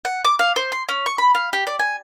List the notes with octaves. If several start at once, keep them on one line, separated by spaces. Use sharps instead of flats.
F#5
D6
F5
C5
C6
C#4
C#6
B5
F5
G4
D5
G#5